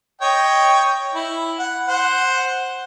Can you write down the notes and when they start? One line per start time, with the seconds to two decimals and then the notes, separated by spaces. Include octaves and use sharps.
0.22 C#5 D#5 G5
1.14 E4
1.59 F#5
1.88 C5 F#5